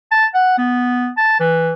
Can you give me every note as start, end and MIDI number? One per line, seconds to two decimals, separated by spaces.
0.11 0.26 81
0.34 0.57 78
0.58 1.09 59
1.17 1.38 81
1.40 1.73 52